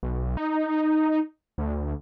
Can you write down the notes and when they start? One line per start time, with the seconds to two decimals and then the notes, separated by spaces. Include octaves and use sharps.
0.03 B1
0.37 D#4
1.58 D2